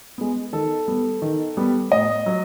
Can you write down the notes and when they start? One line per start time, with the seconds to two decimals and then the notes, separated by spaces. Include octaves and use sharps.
0.18 G#3 B3
0.53 D#3 A4
0.88 G3 B3
1.22 D#3
1.57 G3 B3
1.91 A2 D#5
2.26 F#3